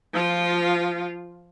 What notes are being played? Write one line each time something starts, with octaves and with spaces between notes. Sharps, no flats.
F3 F4